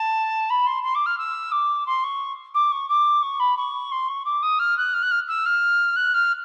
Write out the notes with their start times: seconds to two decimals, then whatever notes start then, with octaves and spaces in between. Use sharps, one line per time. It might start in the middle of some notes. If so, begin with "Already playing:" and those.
Already playing: A5
0.50 B5
0.67 C6
0.83 C6
0.95 D6
1.06 F6
1.18 E6
1.52 D6
1.86 C6
2.04 C#6
2.54 D6
2.72 C#6
2.89 D6
3.22 C#6
3.40 B5
3.57 C#6
3.92 C6
4.08 C#6
4.25 D6
4.42 D#6
4.59 F6
4.77 F#6
4.93 F6
5.02 F#6
5.11 F6
5.28 E6
5.45 F6
5.96 F#6
6.14 F6